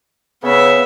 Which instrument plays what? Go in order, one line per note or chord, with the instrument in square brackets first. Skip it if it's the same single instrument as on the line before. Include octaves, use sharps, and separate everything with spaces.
[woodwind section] C#3 [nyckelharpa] B3 E5